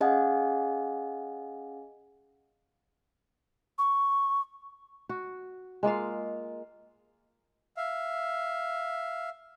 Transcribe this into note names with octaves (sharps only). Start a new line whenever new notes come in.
C#4 G#4 D#5 F5 F#5 G#5
C#6
F#4
G#3 A#3 F4 F5
E5 F5